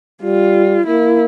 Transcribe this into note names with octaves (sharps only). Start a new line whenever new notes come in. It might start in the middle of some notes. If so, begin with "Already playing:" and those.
G3 F4
A#3 E4